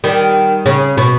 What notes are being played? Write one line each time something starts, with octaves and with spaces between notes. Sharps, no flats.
D#3 G3
C#3
B2